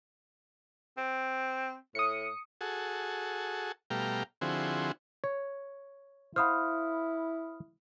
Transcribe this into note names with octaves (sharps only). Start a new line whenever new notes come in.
C4
A2 D#6 C#7
F#4 G#4 A4
B2 G3 A3 F5 G5 A#5
D3 F3 C4 E4 F#4 G#4
C#5
E4 C5 F5 F#5 B5 D#6 F6